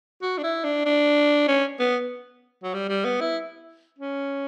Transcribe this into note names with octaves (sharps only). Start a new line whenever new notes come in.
F#4
D4
E4
D4
D4
C#4
B3
F#3
G3
G3
B3
E4
C#4